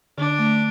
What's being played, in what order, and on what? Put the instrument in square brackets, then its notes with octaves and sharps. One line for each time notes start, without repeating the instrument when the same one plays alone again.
[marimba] D3 [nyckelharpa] D4
[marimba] A3